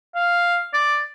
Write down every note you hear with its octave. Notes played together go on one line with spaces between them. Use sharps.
F5
D5